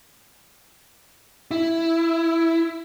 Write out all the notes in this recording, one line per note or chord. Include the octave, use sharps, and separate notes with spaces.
E4